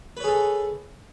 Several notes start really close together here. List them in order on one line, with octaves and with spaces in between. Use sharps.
B4 C#5 G#4 A4